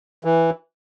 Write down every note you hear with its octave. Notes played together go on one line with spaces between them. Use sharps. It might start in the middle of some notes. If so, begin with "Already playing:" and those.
E3